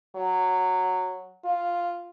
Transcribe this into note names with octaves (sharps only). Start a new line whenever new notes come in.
F#3
F4